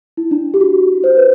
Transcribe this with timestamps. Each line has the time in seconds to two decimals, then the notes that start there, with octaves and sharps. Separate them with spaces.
0.17 E4
0.31 D4
0.54 G4
0.61 F#4
1.04 C5
1.17 B4